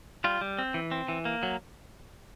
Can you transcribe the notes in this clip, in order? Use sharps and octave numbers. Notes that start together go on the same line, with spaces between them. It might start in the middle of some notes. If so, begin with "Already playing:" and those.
G3 F4
G3
C4
E3
C4
E3
A#3
F#3